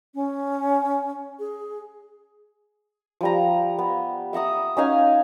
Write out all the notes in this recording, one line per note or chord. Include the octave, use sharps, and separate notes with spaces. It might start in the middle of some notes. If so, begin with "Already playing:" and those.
C#4
G#4
F3 G3 A#5
B3
E5 F#5 A#5 D#6
C#4 D#4 F5 G#5